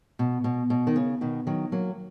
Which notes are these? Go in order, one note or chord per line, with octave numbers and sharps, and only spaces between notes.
B2
B2
B2
D#3
C#3
B2 D#3
D#3 F#3
F#3 A#3